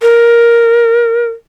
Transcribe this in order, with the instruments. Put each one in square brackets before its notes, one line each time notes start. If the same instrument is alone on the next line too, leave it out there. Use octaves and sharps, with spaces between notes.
[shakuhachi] A#4